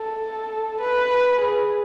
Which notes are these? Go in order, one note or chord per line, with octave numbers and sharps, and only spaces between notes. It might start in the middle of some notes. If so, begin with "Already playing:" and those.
Already playing: A4
B4
G#4